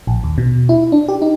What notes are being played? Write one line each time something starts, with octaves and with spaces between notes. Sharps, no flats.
A#1
D#2
B2
E4
D4
G4
D#4